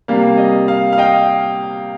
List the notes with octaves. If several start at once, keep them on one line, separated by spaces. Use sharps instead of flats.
C3 G3 A#3 F5
D#5
F5
F5
D#5 G5